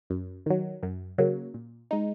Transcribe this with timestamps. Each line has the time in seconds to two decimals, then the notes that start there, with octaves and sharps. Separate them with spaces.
0.10 F#2
0.46 D#3 F#3
0.83 F#2
1.18 C#3 F#3 A#3
1.54 A#2
1.91 G#3 D#4